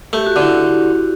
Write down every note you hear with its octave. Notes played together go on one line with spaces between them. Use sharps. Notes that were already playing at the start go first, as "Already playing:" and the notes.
A3 G4
F#4
D3 E4